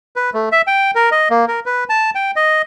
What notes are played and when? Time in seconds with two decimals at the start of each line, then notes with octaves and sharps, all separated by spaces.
0.16 B4
0.34 A3
0.52 E5
0.67 G5
0.95 A#4
1.11 D#5
1.30 A#3
1.48 A#4
1.66 B4
1.89 A5
2.15 G5
2.36 D#5